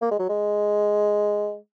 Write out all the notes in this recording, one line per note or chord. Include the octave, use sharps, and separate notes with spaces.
A#3
G#3
F#3
G#3